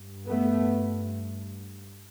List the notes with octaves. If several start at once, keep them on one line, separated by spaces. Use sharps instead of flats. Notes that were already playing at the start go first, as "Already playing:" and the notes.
Already playing: G2
A3 B3